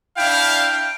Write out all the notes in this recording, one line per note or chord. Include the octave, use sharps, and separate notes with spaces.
D4 E4 F5 G5